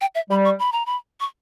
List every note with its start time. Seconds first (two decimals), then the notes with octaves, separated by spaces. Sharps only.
0.01 G5
0.15 E5
0.30 G3 B5
0.45 C#6
0.59 B5
0.72 A#5
0.86 B5
1.20 C#6